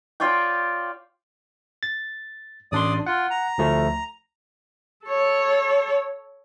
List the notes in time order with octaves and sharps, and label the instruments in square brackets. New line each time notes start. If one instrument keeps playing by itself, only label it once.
[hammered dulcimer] F4 C#5 D5 G5
[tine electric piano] A6
[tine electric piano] A1 D4 C6 [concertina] D5 D#6
[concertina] F4 [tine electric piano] F#5
[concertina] A#5
[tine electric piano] D2 F3 A3
[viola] A4 C#5